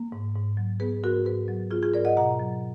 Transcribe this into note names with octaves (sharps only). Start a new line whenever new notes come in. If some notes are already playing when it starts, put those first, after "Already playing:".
Already playing: A#3
G#2
G#2
F#3
B3 G#4 B4
G#2 F#4 A#4
G#2 G#4 B4
F#3
B3 F4 G#4
F4 G#4
G#2 A#4 D5
D#5 F#5
B2 F#5 A#5
F#3